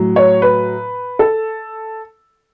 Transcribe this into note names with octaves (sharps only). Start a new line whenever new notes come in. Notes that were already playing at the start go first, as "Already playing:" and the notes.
Already playing: A2 F#3
C#5
B4
A4